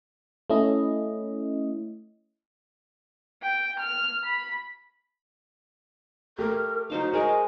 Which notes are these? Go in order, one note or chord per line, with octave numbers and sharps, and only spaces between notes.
A3 C#4 E4 D#5
G5
F6
B5
A3 G4 A#4
F#3 D#4 C5 F5
G#3 G#4 A#4 D#5 D6